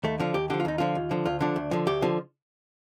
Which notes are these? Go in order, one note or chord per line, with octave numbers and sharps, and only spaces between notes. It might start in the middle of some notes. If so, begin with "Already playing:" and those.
D#2 A3
D3 F3 F4
D#2 G4
D3 F3 G4
F4
D#2 D#4
D3 F3 F4
D#2
D3 F3
D2 F4
D3 F3 D4
D2
D3 F3
D2 G4
D3 F3